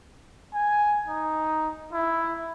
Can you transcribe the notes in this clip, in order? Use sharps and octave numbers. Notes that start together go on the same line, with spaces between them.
G#5
D#4
E4